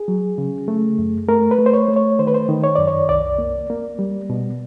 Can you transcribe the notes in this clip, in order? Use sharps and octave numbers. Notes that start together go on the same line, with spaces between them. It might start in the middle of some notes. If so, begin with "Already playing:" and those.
Already playing: G#4
F#3
C#3
A3
F#2
A3 A#4
B4
A3
C5
C#5
A3
C#5
D#3 C5
B4
C5
D#3
C#5
F#2 D5
C#5
C2 D5
A#3
A#3
G3
B2